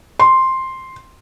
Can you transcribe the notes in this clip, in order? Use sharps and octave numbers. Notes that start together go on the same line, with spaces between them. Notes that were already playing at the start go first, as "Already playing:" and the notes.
C6